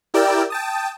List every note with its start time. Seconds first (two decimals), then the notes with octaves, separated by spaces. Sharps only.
0.14 E4 G4 A#4 D5 G5 E6
0.50 G5 A5 D#6